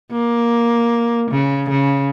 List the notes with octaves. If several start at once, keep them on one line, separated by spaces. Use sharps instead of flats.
A#3
C#3
C#3